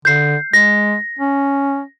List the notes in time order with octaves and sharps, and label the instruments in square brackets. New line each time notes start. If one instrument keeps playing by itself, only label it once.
[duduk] D3 [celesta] G6 C7
[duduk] G#3 [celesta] A#6
[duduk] C#4